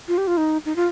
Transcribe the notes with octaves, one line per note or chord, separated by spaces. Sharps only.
F4
G4
F4
D#4
D#4
F4